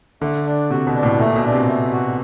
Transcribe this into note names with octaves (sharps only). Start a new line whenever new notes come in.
D3 A3
D4
C3 F#4
B2
D4
A2
A#2 A3
B2
D4
C3
A3
F#4